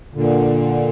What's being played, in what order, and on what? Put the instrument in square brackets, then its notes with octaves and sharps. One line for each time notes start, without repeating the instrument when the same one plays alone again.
[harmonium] A#2 D3